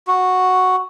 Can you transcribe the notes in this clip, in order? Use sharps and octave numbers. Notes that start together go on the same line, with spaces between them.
F#4